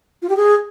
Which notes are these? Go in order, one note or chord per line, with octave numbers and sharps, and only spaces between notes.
F4
G4
G#4